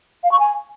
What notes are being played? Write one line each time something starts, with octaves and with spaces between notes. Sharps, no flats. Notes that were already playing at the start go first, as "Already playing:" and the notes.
F5
C#6
G#5